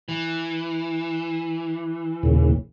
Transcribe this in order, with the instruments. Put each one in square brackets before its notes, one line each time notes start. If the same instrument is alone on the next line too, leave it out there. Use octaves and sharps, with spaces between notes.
[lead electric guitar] E3
[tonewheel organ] D#2 A#2 C#3